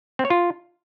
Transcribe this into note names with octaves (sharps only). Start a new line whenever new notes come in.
C4
C#5
F4